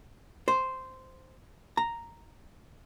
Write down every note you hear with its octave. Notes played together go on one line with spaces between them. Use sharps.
C5
A#5